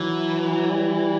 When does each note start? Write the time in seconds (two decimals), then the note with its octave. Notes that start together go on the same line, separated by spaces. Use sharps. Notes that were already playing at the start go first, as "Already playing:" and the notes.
Already playing: E3 F#3
0.71 G3